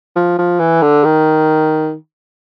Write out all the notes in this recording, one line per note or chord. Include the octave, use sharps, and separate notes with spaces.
F3
F3
E3
D3
D#3